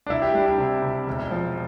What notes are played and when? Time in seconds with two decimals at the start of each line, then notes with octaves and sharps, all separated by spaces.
0.07 D4
0.10 C2 E4
0.22 G4
0.34 G3 D4
0.46 D4
0.58 C3
0.82 C3
1.07 E1
1.31 F3